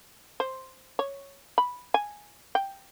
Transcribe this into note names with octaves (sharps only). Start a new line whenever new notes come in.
C5
C#5
B5
G#5
G5